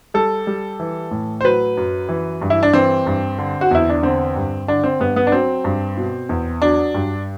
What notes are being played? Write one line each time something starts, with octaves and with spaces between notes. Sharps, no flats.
G3 A4
G3
E3
A2
C5
F#3 B4
F#2
E3
G2
E4
D4
E3 C4
G2
D3
F#4
E2 E4
D4
D3 C4
G2
D3 D4
C4
G2 B3
B3
D4
F#3 C4
G2
B2
E2
F#3 D4
G2